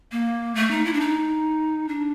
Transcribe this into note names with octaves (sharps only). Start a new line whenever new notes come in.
A#3
A3
D#4
E4
D4
D#4
D4